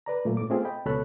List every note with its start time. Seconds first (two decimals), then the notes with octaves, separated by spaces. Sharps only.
0.06 B4 D5 A#5
0.25 A#2 F#3 A3 A#3
0.37 A2 D6
0.50 A3 B3 C4 F4 G#4
0.65 D#5 G5 B5
0.85 C#2 B2 A4 C#5 B5 F#6